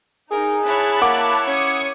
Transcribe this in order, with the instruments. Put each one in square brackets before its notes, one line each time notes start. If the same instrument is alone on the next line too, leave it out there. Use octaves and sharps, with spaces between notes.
[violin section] D#4 [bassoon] G#4 [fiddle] A#4
[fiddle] E4 C#5 [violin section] A5 B5 F#6
[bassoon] A#3 [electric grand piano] F#5 D6
[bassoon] C#4 [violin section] D#6 G#6 C#7